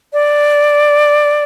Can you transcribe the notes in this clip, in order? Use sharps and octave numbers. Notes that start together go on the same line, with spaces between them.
D5